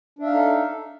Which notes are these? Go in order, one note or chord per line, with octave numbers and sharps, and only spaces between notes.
D4 D#4 A4 E5 F5